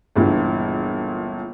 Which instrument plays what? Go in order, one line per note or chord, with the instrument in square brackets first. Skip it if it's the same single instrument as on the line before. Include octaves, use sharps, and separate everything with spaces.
[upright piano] G1 C#2 A#2 D3 E3